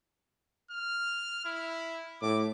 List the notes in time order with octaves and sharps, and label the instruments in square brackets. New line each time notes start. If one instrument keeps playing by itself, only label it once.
[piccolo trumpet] F6
E4
[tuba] A2 [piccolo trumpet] D6